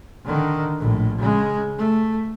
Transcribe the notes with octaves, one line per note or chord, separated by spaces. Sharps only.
D3 D#3
A#1 A2
C#3 G#3
A3